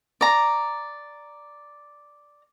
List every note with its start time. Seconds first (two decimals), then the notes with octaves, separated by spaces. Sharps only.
0.21 D5 A#5